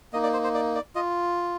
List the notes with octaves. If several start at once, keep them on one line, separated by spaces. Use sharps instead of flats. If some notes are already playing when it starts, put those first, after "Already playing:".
A#3 D#4 D#5
D5
C5
C5
D5
D5
F4 D#5